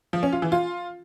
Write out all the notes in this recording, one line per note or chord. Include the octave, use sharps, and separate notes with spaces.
F3
C#4
F4
E3
F4